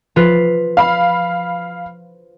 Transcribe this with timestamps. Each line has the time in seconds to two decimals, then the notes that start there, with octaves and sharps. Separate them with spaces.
0.16 F3 F4 B4
0.77 F5 B5